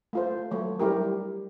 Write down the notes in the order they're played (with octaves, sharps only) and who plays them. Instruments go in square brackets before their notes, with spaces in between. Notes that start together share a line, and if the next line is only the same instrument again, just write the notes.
[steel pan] A3 F4 C5
F#3 A3 C#5
G3 E4 G4 A#4